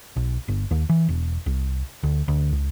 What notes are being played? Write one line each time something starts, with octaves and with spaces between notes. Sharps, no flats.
B1
G1
D#2
E3
E1
C2
D2
D2
C#2